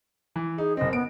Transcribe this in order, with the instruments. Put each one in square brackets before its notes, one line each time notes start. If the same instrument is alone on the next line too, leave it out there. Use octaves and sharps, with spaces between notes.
[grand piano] E3
[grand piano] D#4 [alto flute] G#4
[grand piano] F#1 C4 [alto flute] D#5
[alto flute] B3 [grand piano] D7